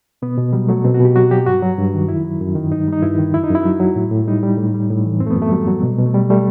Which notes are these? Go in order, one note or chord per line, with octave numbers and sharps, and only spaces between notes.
B2 B3
B2
F#3 G3
F#3 A3
B2 C4
F#4
B2 G4
F#3 F#4
F#3 G4
G2 F#4
F#3
G2
D#3
F#2 E4
F#3
F#2
D#3
G2 D#4
G3
D#4
G2 E4
D#3
F#2 E4
D#4
F#2
E4
F#3
F#3
A2
A2
G3 D#4
G3
A2
G3
A2
E3
F#2 C4
A3
B3
F#2
A3
F#3 G3
F#3
B2
B2
A3
G3
G3 A3